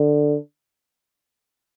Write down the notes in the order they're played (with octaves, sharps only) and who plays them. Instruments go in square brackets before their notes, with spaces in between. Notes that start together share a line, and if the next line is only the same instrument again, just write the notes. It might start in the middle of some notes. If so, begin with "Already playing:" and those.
Already playing: [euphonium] D3